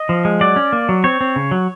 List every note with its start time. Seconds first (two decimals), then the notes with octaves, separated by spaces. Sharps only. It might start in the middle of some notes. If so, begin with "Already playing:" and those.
Already playing: D#5
0.09 F3
0.25 G#3
0.41 F#3 D5
0.56 C#4
0.73 A#3
0.89 F#3
1.04 C4 C#5
1.21 C4
1.36 C#3
1.51 F#3